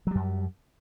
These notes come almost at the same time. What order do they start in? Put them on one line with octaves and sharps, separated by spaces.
F#3 G3 F#2